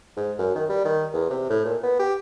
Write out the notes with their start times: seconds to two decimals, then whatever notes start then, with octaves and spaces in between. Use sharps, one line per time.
0.17 G#2
0.39 F#2
0.55 D#3
0.69 G3
0.85 D#3
1.13 E2
1.30 C3
1.50 A2
1.65 A#2
1.83 B3
1.99 G4